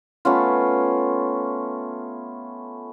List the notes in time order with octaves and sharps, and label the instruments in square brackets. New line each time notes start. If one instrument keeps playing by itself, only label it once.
[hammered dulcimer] A3 B3 C#4 F4